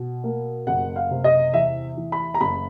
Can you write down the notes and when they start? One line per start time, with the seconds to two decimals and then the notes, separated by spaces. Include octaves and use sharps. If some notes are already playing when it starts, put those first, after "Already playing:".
Already playing: B2
0.24 A#3
0.67 F#1 F#5
0.96 F5
1.11 C3
1.24 D#5
1.54 E2 E5
1.97 E3
2.12 B5
2.34 A#5
2.41 F#1 B5